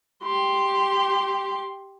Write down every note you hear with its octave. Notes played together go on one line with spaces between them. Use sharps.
G4 C6